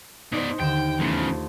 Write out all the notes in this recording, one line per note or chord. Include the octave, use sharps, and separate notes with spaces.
B2 D#4 C5 D5
D#2 D3 G5 E7
E2 C#3 A3 C5
F4